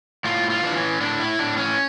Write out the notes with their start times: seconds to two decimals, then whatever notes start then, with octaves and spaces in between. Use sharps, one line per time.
0.24 A2 F4
0.50 F4
0.63 E3 D4
0.76 C#4
1.01 A2 D4
1.20 E4
1.39 A2 D4
1.57 C#4